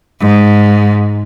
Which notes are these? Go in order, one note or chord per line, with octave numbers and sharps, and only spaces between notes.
G#2